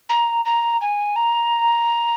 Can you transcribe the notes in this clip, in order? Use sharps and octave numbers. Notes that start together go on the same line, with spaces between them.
A#5
A#5
G#5
A#5